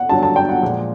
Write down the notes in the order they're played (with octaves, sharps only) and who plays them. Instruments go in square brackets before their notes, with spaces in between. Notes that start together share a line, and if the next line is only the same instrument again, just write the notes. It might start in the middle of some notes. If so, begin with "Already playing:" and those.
Already playing: [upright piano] F#5
[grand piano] G2 D3 F#3 [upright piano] A5
[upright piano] A5
G5
F#5
[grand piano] A#2 F3 G#3